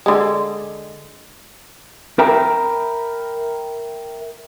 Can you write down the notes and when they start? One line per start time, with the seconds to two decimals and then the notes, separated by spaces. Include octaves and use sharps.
0.06 D3 G#3
2.19 A#4 E5 G5 A#5 B5